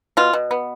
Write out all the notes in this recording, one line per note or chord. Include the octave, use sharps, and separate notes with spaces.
B2 F4
B2
B3